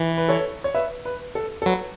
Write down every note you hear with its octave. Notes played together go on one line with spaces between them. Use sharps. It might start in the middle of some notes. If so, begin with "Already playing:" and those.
Already playing: E3
B4
A4 C#5
C#5
B4 E5
B4
A4
A4
F#3 B4